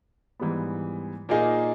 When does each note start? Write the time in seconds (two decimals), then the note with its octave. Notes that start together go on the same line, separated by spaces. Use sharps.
0.40 G#2 E3 G3 B3
1.29 A#2 A#3 D#4 G#4